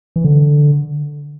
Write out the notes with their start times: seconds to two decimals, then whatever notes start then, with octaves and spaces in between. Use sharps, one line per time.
0.16 E3
0.25 D3